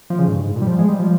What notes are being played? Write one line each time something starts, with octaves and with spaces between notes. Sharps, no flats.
F3
C#3
G#2
G2
G#2
A#2
G3
F3
G#3
G3
F3